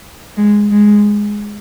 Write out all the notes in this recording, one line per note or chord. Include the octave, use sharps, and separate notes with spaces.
G#3
G#3